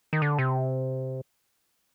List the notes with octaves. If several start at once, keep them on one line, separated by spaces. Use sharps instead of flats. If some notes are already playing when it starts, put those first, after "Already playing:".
D#3
D3
C3